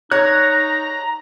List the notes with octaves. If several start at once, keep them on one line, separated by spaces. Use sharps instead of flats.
D#4 C#5 A#5 F#6